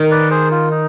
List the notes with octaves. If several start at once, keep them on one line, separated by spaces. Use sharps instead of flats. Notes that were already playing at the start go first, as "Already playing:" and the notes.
Already playing: D#3
B4 D5
G#4 C5
F4
D#4